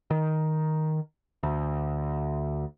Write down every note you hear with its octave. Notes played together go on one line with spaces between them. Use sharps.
D#3
D2